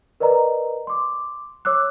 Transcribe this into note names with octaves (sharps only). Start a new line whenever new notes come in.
A#4 B4 D5 D#5 A#5
C6 D6
C#5 D6 E6 F#6